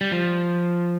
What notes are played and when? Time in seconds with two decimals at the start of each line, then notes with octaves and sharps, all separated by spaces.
0.01 G3
0.12 F3